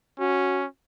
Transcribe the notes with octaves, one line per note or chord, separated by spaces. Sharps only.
C#4 F#4